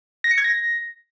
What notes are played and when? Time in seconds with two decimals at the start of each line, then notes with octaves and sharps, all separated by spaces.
0.24 A#6
0.31 C#7
0.38 G#6
0.44 A#6